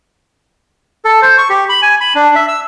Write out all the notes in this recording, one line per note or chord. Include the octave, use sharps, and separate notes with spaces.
A4
C5
C#6
G4
B5
G#5
B5
D4
E5
E6